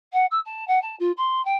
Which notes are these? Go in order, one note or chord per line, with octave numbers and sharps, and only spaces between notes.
F#5
E6
A5
F#5
A5
F4
C6
G5